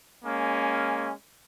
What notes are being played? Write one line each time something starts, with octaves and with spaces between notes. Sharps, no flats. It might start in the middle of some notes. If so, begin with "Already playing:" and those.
G#3 A#3 C#4 G#5